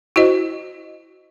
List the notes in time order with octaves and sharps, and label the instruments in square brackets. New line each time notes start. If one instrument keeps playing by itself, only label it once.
[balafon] E4 F#4 C5 D#5